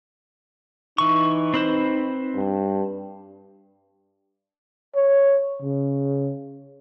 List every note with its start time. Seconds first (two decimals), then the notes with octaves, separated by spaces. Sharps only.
0.98 E3 D#4 C#6
1.54 C4 B4 C5
2.36 G2
4.96 C#5
5.62 C#3